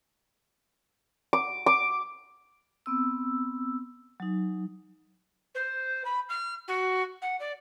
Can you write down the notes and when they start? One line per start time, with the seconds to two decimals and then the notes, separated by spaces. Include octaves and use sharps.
1.33 D6
1.66 D6
2.86 B3 C4 E6
4.20 F#3 D#4
5.54 C5
6.04 B5
6.29 F6
6.67 F#4
7.21 F#5
7.39 D5